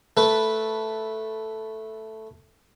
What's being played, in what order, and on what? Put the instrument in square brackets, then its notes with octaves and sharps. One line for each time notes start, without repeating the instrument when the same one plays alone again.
[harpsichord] A3 B4